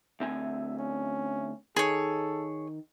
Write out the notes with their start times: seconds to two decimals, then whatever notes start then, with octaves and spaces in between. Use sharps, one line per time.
0.20 D2 C4 E5 G#5
0.79 C#4
1.76 D#3 G#4 A4 C#5